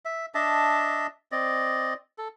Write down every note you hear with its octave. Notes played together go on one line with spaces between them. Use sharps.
E5
D4 D#5 E5 A5
C4 D5 D#5
A4